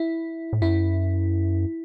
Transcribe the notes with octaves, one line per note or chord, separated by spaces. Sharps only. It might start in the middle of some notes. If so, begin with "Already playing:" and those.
Already playing: E4
A2
F#2 E4